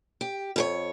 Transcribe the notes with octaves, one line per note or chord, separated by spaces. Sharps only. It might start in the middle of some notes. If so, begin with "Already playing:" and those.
G4
F2 G#4 C#5